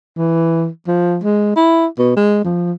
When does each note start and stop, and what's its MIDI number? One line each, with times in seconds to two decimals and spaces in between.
0.17 0.67 52
0.88 1.18 53
1.23 1.55 56
1.56 1.86 64
1.98 2.12 47
2.16 2.42 56
2.44 2.72 53